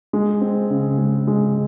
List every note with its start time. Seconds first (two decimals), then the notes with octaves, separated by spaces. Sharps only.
0.13 G#3
0.41 C4
0.70 C#3
0.98 G#3
1.27 G#3